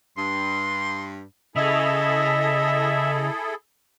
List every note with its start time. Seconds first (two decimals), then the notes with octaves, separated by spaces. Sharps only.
0.18 G2 C6
1.56 C#3 E4 G#4 A4 D#5 E5